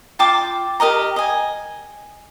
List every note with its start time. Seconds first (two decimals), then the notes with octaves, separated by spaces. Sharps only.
0.19 F4 G5 A5 D6
0.80 G4 A#4 D#5 A#5
1.16 D#5 G#5